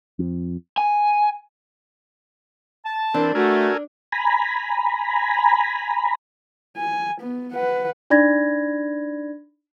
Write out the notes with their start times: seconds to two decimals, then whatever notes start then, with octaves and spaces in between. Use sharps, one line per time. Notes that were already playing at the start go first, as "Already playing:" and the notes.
0.19 F2
0.78 G#5
2.86 A5
3.14 E3 C4 D4 A#4
3.35 A3 F#4 A4 A#4 G#5
4.12 G#5 A#5 B5
6.77 G#5
7.20 B3
7.53 B4 F#5
8.10 D4 D#4 D5 B5 G#6 A#6